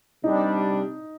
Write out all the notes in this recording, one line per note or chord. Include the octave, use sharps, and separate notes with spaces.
C3 G3 D4 D#4